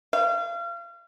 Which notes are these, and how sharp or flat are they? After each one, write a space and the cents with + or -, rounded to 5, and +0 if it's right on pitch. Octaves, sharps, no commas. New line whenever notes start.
F5 -35